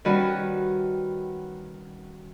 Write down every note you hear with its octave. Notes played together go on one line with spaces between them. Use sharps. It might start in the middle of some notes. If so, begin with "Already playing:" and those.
D#3 G3 C#4 F#4 B4